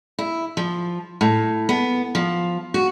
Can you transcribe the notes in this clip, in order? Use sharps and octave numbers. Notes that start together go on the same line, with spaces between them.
E4
F3
A2
B3
F3
F#4